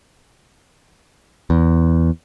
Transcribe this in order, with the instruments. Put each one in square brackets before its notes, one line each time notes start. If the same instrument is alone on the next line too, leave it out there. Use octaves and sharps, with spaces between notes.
[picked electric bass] E2